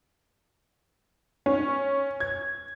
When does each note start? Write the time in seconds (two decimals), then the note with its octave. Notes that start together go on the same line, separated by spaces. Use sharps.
1.46 C#4
2.20 G#6